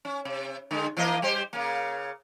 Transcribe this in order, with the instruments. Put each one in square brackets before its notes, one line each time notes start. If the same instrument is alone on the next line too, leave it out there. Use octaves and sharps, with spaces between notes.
[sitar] C#4
C3
D3 G#3
E3 A#3 D#5
G3 G4 C5
C#3 A#3